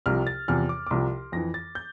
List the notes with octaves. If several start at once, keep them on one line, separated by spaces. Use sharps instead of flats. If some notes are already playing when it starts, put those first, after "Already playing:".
C2 C3 F3 F6
A6
E2 C3 F3 F6
D6
D6
C2 C3 F3 C6
F2 E3 A#6
A6
G6